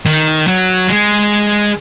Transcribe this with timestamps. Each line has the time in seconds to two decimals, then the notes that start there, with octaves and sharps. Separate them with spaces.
0.06 D#3
0.47 F#3
0.88 G#3